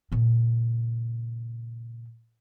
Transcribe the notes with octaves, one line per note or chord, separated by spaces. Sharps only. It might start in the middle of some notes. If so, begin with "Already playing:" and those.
A#2 C#3